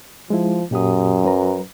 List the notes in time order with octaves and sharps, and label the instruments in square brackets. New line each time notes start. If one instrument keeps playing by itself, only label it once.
[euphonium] F3 [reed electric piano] G#3 E4
[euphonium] F#2 [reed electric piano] A#2 G4 D#6
[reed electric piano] F#3 B4 A#5